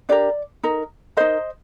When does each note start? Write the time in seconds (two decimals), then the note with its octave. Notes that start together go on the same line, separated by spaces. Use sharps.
0.09 D4 G4 A#4 D5
0.63 D#4 A#4
1.17 D#4 A#4 C5 D#5